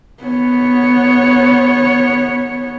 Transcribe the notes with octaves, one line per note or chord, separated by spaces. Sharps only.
B3 C#5